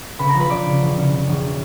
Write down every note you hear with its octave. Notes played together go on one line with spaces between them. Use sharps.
C#3 B4 B5
A#4 A#5
F3
B4 B5
C#3 D5 D6
C#3
E1
C#3
C#3
E1